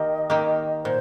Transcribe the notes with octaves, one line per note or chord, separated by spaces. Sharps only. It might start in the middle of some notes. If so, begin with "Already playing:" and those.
Already playing: D#3 A#3 G4 D#5
D#3 A#3 G4
A#2 C5